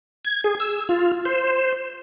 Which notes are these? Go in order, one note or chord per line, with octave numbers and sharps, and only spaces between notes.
G#6
G#4
E6
F4
C5